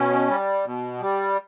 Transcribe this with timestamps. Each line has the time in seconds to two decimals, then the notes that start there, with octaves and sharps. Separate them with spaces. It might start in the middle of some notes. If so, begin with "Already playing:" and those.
Already playing: B2 C#4
0.29 G3
0.65 B2
1.01 G3